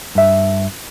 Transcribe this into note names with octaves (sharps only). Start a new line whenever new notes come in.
G2 E5